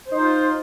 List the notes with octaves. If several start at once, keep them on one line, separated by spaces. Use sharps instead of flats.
D#4 F4 C5